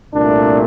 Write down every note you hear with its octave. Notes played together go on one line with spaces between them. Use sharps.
C2 A#2 A3 D4